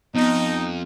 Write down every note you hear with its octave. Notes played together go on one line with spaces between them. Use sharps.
F2 B3 D#4